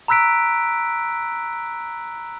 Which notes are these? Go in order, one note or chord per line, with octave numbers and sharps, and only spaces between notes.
A#5 B5 E6 F#6 B6 D7